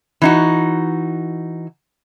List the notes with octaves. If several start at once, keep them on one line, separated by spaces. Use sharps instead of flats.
E3 D#4 F#4